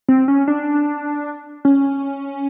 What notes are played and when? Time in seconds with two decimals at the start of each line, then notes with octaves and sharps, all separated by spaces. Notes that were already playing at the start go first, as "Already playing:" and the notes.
0.09 C4
0.28 C#4
0.48 D4
1.65 C#4